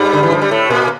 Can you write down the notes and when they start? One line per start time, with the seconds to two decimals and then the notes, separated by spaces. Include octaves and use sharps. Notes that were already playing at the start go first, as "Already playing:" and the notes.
Already playing: G2 G3
0.13 D3
0.23 E3
0.32 F3
0.42 G3
0.51 A2 A3
0.70 A#2 A#3